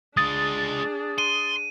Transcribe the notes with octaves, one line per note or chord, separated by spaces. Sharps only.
G#3 D4 F4 G#4 D#6 A6
C6 D#7